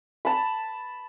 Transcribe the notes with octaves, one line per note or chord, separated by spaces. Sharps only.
A5 B5